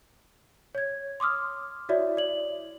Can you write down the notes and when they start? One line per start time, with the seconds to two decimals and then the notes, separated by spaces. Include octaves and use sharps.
0.75 C#5 G#6
1.20 C6 D6 D#6 F6
1.89 E4 F#4 C#5 D5 E5
2.17 D5 F#7